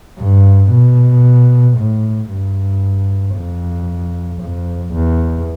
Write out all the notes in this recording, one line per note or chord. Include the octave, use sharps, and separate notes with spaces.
G2
B2
A2
G2
F2
F2
E2